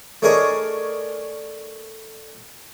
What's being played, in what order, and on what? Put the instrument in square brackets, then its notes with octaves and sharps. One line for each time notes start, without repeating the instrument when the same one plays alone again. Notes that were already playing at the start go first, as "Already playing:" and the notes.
[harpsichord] A3 D4 G#4 A#4 C#5 D#5